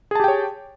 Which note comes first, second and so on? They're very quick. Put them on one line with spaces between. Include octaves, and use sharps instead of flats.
G#4 A5 G4 G5 C#5